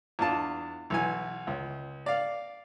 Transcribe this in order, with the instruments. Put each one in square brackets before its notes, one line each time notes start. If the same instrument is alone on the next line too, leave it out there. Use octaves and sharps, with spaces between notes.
[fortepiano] E2 D4 F4 A5
B1 E3 G#5
C#2
D5 F5